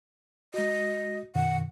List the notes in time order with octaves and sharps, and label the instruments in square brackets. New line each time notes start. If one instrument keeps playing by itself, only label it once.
[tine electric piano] G#3 F#4 [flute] D#5
[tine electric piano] F#2 B2 D#3 [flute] F#5